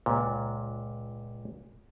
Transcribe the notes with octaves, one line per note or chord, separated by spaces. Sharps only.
C#2 A#2